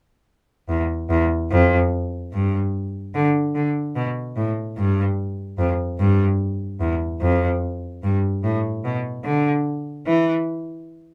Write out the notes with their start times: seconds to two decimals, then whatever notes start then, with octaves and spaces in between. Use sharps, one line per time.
0.69 E2
1.10 E2
1.51 F2
2.32 G2
3.14 D3
3.55 D3
3.95 B2
4.36 A2
4.77 G2
5.58 F2
5.99 G2
6.80 E2
7.21 F2
8.03 G2
8.43 A2
8.84 B2
9.24 D3
10.07 E3